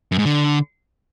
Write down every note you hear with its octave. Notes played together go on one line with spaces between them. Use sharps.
F#2
G#2
D3